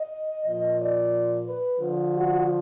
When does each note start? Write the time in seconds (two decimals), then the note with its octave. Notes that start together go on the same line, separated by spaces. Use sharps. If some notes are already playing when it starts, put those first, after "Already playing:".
Already playing: D#5
0.45 A#2 F3 D#5
0.79 D5
1.46 B4
1.80 D3 F3
2.13 F#4